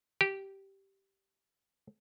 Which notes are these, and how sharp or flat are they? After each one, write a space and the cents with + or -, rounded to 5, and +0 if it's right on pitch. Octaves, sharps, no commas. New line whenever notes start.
G4 -10